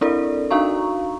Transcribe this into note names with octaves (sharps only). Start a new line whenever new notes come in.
C4 D4 E4 A4 A#4 D5
D4 D#4 F#4 F5 A#5 C#6